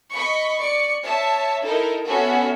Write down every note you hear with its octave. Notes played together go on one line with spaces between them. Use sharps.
D#5 B5 C#6
D5 C#6 C#7
C#5 E5 A5
D#4 E4 A4 A#4 D#5
B3 C#4 F#4 G#4 A4 E5